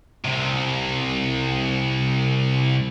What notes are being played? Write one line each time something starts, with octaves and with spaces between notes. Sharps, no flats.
C2 C3